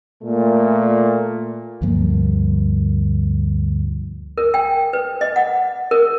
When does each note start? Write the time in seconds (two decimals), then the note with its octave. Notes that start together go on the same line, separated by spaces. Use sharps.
0.23 A#2 A3
1.82 D2 G2 F3 A#3
4.38 A#4
4.54 G5
4.93 B4
5.21 D#5
5.36 F#5
5.91 A#4